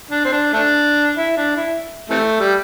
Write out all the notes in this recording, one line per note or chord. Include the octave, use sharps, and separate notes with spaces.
D4
C4
D4
A3 D4
E4
D4
E4
C3 E3 A3
G3